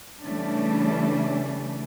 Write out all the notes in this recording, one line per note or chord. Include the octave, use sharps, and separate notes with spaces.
C#3 E3 G3 A3 C#4 D4